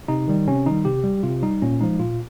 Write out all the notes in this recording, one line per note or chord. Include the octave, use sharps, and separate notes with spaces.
C3 D#4
D#3 G3
C3 C#4
D#3 G3 D#4
C3 G4
G3
C3 F4
G3 D#4
A#2 C#4
F3 G#3 D#4
A#2 F4